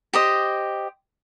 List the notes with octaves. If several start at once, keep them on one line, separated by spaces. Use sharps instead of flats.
G4 C5 D#5